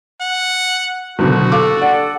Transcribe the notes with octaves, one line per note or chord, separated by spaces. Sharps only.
F#5
F#1 B2 D3 F#4
D4 G4 A4 F5 D6
D5 F#5